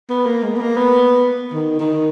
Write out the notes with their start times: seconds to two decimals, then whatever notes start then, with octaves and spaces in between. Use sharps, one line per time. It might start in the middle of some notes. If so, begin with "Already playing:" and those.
0.10 B3
0.26 A#3
0.43 G#3
0.56 B3
0.61 A#3
0.77 B3
1.53 D#3
1.80 D#3